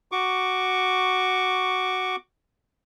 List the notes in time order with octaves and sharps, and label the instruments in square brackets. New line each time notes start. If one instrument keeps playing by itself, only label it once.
[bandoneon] F#4 C#6 D6